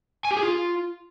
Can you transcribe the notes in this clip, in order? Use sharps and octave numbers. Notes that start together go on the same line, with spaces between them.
G#5
G4
G#4
F4